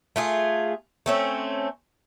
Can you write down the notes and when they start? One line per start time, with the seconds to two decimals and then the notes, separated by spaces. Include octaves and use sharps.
0.16 A3 F4 G#4
1.06 A3 C4 C#4